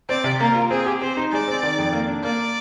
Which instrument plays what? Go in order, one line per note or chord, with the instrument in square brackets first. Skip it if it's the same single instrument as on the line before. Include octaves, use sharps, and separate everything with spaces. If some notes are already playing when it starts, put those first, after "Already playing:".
[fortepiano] C4 [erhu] D5
[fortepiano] C3
[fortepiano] A#3 [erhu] A#4
[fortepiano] F4
[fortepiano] C4 [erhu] G#4
[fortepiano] G4
[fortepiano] C4 [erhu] C5
[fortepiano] D#4
[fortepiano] G#3 [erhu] D5
[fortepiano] C4
D#3
F2
A#3
D4
[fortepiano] A#3 [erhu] D5